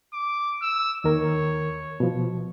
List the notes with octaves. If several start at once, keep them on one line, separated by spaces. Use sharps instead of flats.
D6
E6
D#2 D#3 A#4 C#5
B2 F3